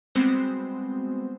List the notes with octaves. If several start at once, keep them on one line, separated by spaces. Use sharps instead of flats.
G3 G#3 B3 C4 F#4 C5